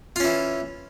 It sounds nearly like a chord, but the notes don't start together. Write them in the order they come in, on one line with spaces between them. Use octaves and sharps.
F4 C#4 E3